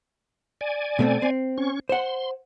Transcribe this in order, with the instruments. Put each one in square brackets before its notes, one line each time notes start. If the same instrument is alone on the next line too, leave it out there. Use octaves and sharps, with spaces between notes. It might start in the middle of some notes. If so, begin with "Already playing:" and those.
[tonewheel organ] D5 G#5
[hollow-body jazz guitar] B2 A3 C4
C4
[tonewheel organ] C#4 C#6
[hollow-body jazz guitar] C5 F#5 [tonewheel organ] C6